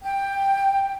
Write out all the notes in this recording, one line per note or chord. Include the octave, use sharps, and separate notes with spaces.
G5